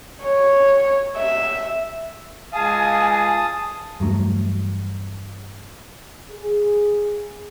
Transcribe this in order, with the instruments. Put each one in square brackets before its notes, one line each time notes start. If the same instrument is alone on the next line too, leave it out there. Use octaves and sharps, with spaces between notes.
[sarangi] C#5
E5
[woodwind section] C#2 G#4 F5 [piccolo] G#5 [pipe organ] A5 D#6
[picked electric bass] E2 G2 F#3 A3
[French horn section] G#4